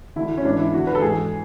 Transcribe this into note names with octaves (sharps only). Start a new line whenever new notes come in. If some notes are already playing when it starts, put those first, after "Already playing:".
D2 D3 E4
C#4
G#2 E3 D4
E4
E2 D3 F#4
B4
A4
G#2 E3 G#4